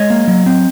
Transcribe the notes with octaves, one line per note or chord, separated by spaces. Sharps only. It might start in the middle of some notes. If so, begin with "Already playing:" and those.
Already playing: G#3 C#5 D#5
A#3
F#3
C4